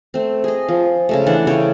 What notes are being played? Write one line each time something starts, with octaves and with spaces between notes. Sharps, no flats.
A3 C4
G#4 D#5
F3
C#3 G#3 A3
E3 D4 F#5
C#3 A3 C#5 G5